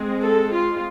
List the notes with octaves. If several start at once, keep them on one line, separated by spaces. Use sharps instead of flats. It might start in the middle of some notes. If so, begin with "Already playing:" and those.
Already playing: G#3 C4
A4
F4